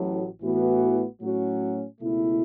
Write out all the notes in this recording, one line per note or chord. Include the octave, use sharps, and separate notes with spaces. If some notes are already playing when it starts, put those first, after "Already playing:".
Already playing: A1 A2 F#3
A1 A2 E3 B3 F#4
A2 F#3 C#4 F#4
C#2 B2 A3 E4